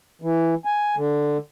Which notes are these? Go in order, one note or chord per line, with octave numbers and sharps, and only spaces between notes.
E3
G#5
D3